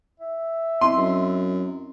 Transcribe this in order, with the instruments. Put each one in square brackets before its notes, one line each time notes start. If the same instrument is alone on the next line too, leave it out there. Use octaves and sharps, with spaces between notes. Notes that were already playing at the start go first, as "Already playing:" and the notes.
[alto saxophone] E5
[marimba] C4 E4 D#5 [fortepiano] C6
[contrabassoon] F#2